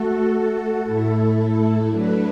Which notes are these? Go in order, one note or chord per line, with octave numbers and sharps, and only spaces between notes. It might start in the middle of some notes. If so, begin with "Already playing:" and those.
Already playing: A3 F#4 A4
A2 A3 E4 A4
F#3 A3 D4 B4